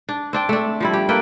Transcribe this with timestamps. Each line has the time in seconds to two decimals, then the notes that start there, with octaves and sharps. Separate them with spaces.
0.09 D4
0.33 C4 D4 G5
0.49 A3 D4
0.80 F3 G3 E4
0.93 G4
1.09 A#3 A4 B4 G5